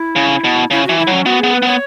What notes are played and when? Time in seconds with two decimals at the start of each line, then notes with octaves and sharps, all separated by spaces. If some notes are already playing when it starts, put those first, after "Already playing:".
Already playing: E4
0.16 C#3
0.44 B2
0.71 C#3 E4
0.85 E3 F#4
0.98 E4
1.07 F#3 C#4
1.26 B3 F#4
1.40 B3 G#4
1.53 B4
1.62 B3 C#5